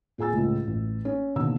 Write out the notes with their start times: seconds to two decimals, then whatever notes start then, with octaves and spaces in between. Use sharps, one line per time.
0.18 A#2 G#4 G#5 E6 A6
0.33 C#2 A2
0.67 A1
1.05 C#4
1.36 B2 D3 D#3 A#3 E6